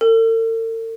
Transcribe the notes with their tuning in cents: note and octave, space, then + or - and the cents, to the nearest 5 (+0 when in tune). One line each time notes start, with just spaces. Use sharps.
A4 +45